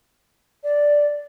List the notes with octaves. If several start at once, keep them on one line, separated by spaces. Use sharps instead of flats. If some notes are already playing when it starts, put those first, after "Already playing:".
D5